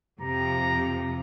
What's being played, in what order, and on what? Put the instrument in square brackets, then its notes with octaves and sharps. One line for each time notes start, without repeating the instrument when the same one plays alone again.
[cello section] F2 C3 F3 [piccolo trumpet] A#5